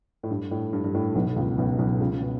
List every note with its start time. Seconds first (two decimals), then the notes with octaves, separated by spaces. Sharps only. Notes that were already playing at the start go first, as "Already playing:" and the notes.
0.23 A2
0.31 G2
0.51 A2
0.73 G2
0.84 G2
0.94 A2
1.15 B1 B2
1.26 B2
1.36 C#2 C#3
1.58 B1 B2
1.79 B1 B2
2.00 C#2 C#3
2.11 C#3
2.21 B2